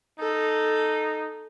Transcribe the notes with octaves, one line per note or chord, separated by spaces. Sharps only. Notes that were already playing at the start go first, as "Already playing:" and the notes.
D#4 A4